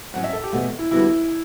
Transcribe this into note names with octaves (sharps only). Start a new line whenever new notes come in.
A2 F#3 C#4 F#5
E5
A4
G4
E2 B2 A3 F#4
E4
D3 G3 B3 E4 F#4